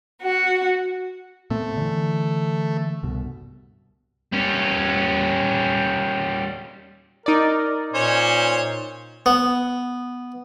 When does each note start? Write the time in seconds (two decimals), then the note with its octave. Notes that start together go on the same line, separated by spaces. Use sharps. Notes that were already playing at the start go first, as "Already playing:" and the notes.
0.22 F#4
1.50 A#2 A3 B3 C4
1.77 D3 E3
3.03 C2 G2 B2
4.33 G3 C#4
7.26 D#4 A#4 D5
7.94 A#2 C#4 C5 C#5
9.26 B3